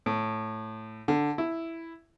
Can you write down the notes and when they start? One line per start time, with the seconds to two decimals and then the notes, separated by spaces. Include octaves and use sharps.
0.06 A2
1.08 D3
1.38 E4